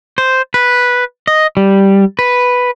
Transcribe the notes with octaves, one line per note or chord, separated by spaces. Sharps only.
C5
B4
D#5
G3
B4